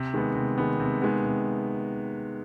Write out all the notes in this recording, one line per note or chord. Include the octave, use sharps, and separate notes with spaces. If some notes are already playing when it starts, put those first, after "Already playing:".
Already playing: C3
D#3 G#3 B3
C3
D#3 G#3 B3
C3
D#3 G#3 B3
C3